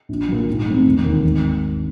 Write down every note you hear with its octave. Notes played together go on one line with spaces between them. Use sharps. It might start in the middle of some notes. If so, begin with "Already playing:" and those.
A#1
A#2 F#3
G#2
F3 A3 C4
E1
D#2 D#3
G#1